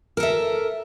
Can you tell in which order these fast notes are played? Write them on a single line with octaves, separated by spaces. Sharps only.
A#4 A4 E5